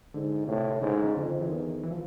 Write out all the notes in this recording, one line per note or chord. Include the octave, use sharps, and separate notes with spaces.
G#2 D3
A2 C3
G#2 C#3
C#3
F2 D3
E3
E2 D#3
E3
F3